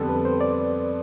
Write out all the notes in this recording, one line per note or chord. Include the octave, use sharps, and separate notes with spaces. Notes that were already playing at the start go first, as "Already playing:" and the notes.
Already playing: F2 D3 G3 B3 A4
B4
C5
D5